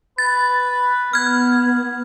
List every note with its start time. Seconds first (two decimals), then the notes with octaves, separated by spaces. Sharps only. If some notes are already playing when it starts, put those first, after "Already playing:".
0.18 B4 A6
1.13 B3 F6 G#6